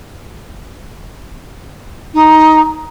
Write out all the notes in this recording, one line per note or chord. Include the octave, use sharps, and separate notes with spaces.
D#4